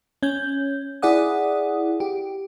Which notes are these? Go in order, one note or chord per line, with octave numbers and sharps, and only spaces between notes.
C#4 G6
E4 G#4 D5 F#5 D#6
G4